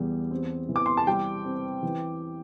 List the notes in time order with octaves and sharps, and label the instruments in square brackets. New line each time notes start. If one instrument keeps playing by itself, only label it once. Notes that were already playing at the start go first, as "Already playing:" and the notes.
Already playing: [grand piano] E2 G3
C4
E3
D6
C6
A5
G3 G5
C4
E3